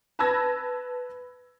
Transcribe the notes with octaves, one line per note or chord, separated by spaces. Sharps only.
B4 A5 B5 E6 G#6 A#6